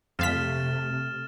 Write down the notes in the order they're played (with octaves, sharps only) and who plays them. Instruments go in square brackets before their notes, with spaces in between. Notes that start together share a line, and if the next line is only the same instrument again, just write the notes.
[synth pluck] F2 F5 B6 [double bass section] C3 A3 [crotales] F6 A6 E7